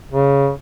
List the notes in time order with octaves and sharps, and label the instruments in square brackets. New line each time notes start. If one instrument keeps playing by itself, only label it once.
[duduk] C#3